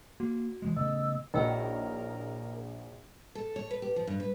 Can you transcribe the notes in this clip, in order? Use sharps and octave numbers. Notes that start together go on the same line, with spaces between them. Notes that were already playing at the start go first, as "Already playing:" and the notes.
A#3 F#4
E3 G3 G#3
C#3 A3 B3 D#5 E6
A#1 F#3 D#4 E4 A#4 D#5 G5 E6
A4
C#5
B4
G4
F3
G2
B4